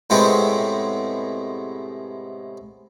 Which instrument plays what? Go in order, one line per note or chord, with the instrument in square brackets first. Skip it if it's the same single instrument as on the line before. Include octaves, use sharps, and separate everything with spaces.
[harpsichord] A2 C3 G#3 B3 C4 G4